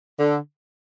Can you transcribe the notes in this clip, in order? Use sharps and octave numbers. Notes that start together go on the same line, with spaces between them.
D3